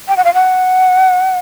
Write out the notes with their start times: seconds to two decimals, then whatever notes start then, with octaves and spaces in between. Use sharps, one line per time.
0.08 G5
0.17 F#5
0.24 F5
0.34 F#5